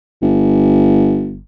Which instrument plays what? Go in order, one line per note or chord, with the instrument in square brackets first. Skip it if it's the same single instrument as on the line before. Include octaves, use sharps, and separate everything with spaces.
[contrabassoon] G1